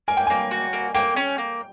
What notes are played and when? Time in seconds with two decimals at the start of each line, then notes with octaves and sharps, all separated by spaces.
0.08 A#3 G#5
0.17 G5
0.27 A#3 G#5
0.51 F#4
0.73 A#3
0.95 A#3 G5
1.16 C#4
1.38 A#3